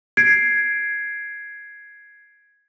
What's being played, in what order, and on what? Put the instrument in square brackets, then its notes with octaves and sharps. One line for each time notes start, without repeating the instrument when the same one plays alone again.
[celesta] G#6 C7 D7